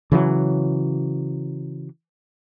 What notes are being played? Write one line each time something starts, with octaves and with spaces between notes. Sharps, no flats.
C#3 E3 F#3